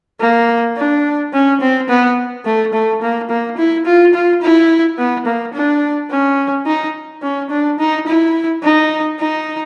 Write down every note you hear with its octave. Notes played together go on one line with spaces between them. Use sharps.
A#3
D4
C#4
C4
B3
A3
A3
A#3
A#3
E4
F4
F4
E4
B3
A#3
D4
C#4
D#4
C#4
D4
D#4
E4
D#4
D#4